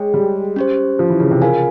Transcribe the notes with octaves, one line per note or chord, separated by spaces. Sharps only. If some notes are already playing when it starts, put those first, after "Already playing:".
Already playing: G#3 G#4 C#5 G5
G3
C#4 G4 C5
F3
E3
C#3
C3
C#3 F4 A#4 F5 G#5